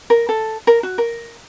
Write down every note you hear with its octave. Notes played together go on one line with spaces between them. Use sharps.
A#4
A4
A#4
F#4
A#4